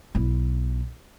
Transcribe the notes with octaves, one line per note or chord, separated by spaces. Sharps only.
B1 E4